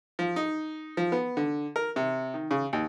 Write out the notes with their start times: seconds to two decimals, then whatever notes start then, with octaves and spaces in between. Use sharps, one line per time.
0.19 F3
0.36 D#4
0.97 F3
1.12 B3
1.37 D3
1.76 A#4
1.96 C3
2.34 D#3
2.51 C#3
2.73 D#2